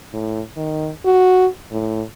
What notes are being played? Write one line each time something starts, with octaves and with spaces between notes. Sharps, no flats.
A2
D#3
F#4
A2